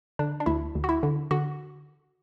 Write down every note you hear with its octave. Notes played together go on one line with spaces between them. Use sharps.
D3 D4
D4
D2 E4
D2
F#4
E4
D3
D3 F#4